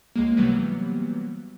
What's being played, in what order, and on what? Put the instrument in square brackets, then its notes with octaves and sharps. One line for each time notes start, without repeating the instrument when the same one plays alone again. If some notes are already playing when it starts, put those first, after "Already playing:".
[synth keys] C#2 G#3 A#3
C3 E3 F#3 G3 A#3 B3